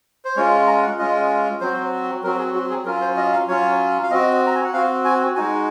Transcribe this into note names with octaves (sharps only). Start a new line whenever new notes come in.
C5
G#3 C#4 F4 C#5
A#5
F#5
G#3 C#4 F4 D#5
F#3 C4 F#4 C5
F#3 C4 F#4 A#4
G#4
F#4
G#4
F#3 C#4 F4 A#4
C5
D#5
F5
F#3 C#4 F4 C#5
F5
C4 F#4 D#5
A#5
G#5
F#5
C4 F#4 F5
G#5
G#3 D#4 F#4 G#5